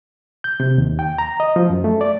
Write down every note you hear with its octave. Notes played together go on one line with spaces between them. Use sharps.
G6
C3
D#2
G5
A#5
D#5
F3
F#2
A3
D5